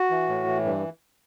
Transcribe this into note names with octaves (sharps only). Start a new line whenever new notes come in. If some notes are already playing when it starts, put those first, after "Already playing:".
Already playing: F#4
E3
A2
E3
G2